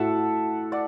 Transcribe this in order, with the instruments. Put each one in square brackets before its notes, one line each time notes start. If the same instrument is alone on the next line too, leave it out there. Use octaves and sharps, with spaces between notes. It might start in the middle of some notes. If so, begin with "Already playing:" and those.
Already playing: [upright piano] A2 A3 F#4 [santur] E5 F#5 A5
[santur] D5 F#5